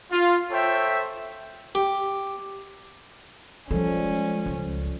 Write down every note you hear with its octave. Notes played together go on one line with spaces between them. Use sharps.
F4
A4 C5 C#5 E5 G5
G4
F3 G3 G#3 C#4 A4
C#2